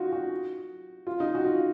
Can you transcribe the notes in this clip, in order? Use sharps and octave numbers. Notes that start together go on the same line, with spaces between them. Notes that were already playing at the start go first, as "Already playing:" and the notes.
Already playing: D#4 F4 F#4
F#4
F4
D#4
F#4
F4